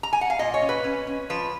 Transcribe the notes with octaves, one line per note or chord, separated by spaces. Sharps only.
A#5
G#5
F#5
F5
A#2 D#5
C#5
C#4
B4
C#4
C#4
F3 B4